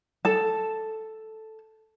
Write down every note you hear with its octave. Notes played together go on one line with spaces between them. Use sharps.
A4 A5